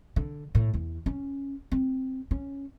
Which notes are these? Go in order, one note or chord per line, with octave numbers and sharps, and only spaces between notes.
D3
A2
E2
C#4
C4
C#4